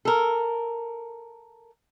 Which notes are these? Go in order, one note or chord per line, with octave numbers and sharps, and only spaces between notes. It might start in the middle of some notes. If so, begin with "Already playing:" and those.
A4 A#4